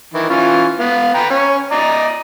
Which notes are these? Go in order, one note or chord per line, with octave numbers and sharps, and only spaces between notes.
D#3 E3
E3 C#4 F4
B3 F5
B4 G5 A#5
C#4 C#5
D5 D#5 A#5